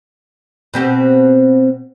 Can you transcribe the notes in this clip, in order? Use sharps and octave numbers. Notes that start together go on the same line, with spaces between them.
B2 C4 G4